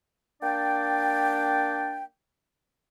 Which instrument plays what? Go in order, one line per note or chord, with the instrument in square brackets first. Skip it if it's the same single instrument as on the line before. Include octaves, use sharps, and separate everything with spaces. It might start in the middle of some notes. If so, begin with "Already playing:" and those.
[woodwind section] A#3 D4 D5 G5